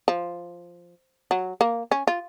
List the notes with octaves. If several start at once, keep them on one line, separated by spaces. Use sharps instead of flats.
F3
F#3
A#3
C#4
F4